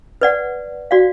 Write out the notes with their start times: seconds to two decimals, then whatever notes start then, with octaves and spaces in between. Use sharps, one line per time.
0.21 B4 D5 F#5
0.91 F#4 D5 F5